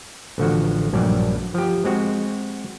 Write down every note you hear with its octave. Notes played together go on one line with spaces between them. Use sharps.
A1 D3 F3 F#4
A#1 G2 F#3 G3 D5
F3 G4
G#3 C4 F#4